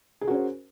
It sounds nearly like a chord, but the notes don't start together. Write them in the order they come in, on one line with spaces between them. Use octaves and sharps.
G#4 A#4 F#4 C#4 C5